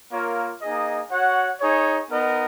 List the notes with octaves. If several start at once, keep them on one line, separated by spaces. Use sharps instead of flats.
A#3 F4 A#4 C#5
A#3 D#4 G#4 D#5
F#4 C#5 F#5
D#4 G#4 C#5
B3 D#4 A#4 D#5